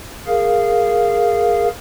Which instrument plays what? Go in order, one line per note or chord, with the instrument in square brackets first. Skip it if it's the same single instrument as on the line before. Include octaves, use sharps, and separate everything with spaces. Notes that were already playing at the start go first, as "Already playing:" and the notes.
[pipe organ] G#4 A#4 F5